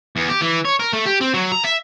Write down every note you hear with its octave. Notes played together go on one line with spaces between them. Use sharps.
E2
G4
E3
C#5
A#4
A3
G4
C4
F#3
A#5
E5